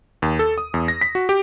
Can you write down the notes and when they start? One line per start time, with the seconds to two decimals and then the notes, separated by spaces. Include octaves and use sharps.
0.22 D#2
0.39 A4
0.58 D#6
0.74 E2
0.88 A#6
1.01 B6
1.15 F#4
1.29 G4